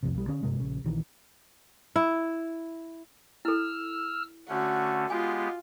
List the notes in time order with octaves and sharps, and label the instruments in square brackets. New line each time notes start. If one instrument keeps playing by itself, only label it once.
[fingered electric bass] C2 F2 C3
B1 G3
D3 C#4
G2 C3 G#3
A#1 C#3
A#1 D#3 E3
[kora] E4
[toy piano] E4 A4 [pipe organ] E6 F6
[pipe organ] D3 A3 C#4 [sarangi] F#4
[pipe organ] G#3 B3 G4 [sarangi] F4 [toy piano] G#5